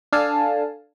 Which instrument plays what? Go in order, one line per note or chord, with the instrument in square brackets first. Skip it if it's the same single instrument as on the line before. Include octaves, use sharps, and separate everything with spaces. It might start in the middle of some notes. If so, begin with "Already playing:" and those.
[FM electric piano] D4 A4 F5 G#5 A5